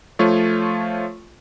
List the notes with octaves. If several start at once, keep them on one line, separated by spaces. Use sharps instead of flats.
F3 A3 F4 C#5